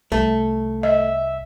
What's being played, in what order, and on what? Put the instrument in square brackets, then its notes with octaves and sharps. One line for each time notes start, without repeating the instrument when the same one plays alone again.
[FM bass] C2 [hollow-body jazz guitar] A3
[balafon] D#5 [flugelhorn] E5